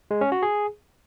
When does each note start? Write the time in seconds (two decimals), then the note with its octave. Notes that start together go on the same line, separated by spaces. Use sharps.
0.11 G#3
0.21 C#4
0.32 F#4
0.43 G#4